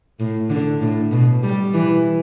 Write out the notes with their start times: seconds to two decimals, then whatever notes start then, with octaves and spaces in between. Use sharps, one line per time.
0.20 A2
0.50 D3
0.81 A2
1.11 B2
1.43 G3
1.74 E3